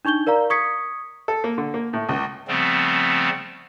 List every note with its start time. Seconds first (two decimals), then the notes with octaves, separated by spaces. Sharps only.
0.05 D4 D#4 C#6 G6 G7
0.27 A#4 D5 F5 A#5
0.50 C#6 D#6 G#6 B6 C#7
1.28 A4
1.44 A#3
1.58 D3
1.74 A#3
1.93 A2
2.09 C#2
2.48 C#3 F3 G3 A3 B3 C4